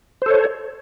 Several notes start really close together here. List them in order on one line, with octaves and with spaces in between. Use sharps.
C5 A4 C#5